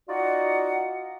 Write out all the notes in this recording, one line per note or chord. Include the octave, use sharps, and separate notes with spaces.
D#4 F4 F#4 D5 D#5 F#5